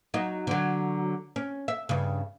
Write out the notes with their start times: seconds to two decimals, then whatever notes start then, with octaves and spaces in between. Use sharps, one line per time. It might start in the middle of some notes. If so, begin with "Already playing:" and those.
0.14 F#3 D#4
0.47 D3 F#3
1.36 C#4
1.68 E5
1.89 G2 C#3